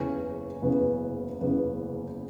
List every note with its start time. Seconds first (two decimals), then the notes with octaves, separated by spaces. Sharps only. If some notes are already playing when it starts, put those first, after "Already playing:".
Already playing: F#1 E2 C#3 E3 C#4
0.61 F#1 E2 C#3 E3 B3
1.41 F#1 E2 C#3 E3 B3